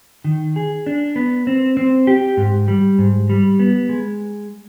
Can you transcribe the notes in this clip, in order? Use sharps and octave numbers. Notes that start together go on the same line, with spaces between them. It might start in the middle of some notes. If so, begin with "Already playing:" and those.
D#3
G#4
D4
B3
C4
C4
G4
G#2
G3
G#2
G3
B3
G#3